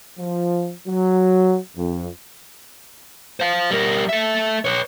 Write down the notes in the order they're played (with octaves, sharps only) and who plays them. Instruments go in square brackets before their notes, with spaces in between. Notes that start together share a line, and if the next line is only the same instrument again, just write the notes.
[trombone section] F3
F#3
F2
[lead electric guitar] C5 F5
G3 A#4
A4 E5
B4 C#5